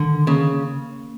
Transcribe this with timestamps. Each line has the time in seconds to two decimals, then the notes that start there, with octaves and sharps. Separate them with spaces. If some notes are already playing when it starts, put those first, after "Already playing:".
Already playing: D3 D#3
0.27 C#3 A#3